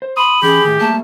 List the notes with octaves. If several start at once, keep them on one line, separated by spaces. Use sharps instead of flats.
C5
B5 C6 D#6
E3 C#4 G4 G#4
A2 D#3
G3 A3 A#3 A5